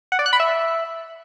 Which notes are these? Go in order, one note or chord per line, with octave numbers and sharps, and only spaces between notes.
F#5
D5
F#6
B5
E5